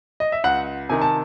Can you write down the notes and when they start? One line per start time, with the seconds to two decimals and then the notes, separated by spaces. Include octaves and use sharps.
0.20 D#5
0.32 E5
0.44 C#2 F#5
0.89 C3 D#3 G#5
1.02 A5